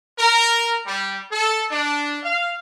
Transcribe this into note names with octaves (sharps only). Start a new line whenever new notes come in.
A#4
G3
A4
D4
F5